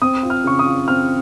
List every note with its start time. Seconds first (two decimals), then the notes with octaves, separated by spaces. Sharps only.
0.02 C4 D#6
0.23 F4
0.30 F6
0.44 C#3 C#6
0.59 D#6
0.66 F4
0.87 C4 F6